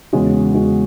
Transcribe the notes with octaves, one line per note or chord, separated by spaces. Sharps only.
E2 C#3 G#3 C#4 F#4
E2 C#3 G#3 C#4 F#4